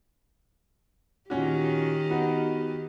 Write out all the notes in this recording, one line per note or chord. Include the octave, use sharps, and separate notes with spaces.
A#2 D#3 C#4 F#4 G4
B3 D#4 F#4